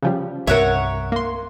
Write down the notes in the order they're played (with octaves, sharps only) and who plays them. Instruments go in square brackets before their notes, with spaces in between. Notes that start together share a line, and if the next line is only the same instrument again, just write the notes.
[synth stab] C#3 F3 G3
[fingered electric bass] C2 G2 C3 [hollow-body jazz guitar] A#4 E5 [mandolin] C#5 F#5
[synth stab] A#3 C6